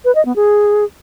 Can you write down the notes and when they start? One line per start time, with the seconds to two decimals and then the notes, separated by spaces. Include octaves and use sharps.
0.05 B4
0.15 D#5
0.25 B3
0.36 G#4